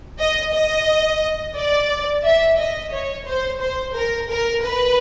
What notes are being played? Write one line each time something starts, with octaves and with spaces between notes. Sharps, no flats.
D#5
D#5
D5
E5
D#5
C#5
C5
C5
A#4
A#4
B4